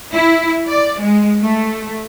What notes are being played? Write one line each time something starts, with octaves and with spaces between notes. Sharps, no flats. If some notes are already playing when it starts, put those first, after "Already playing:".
E4
D5
G#3
A3